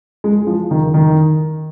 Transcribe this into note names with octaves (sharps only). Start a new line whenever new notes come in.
G#3
F3
D#3
D#3